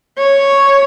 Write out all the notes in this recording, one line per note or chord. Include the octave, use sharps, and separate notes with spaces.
C#5